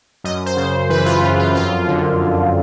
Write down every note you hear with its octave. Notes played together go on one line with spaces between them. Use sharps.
F#2 D#5
C5
C#3
E3 B4
F4
F#2
F4
F2 F4
D3
F2